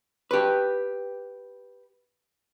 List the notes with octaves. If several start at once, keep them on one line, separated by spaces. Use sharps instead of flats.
G4 B4